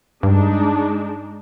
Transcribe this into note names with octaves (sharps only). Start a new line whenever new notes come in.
G2 G#3 D4 D#4